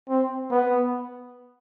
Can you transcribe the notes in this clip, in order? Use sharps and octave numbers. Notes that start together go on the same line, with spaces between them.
C4
B3